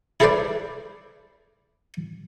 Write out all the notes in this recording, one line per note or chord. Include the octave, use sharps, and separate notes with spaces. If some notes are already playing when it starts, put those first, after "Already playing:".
E4 G#4 A4 B4 C5 D5